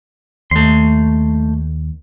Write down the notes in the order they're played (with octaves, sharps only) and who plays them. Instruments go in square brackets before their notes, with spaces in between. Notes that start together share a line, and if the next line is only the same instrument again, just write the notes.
[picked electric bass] D#2 [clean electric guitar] A3 C6